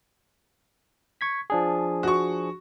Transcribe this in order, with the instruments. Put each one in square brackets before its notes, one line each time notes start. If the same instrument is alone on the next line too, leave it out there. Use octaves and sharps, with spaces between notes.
[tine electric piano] C#6 G#6 B6
F3 D4 G#4
[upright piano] F#4 C#6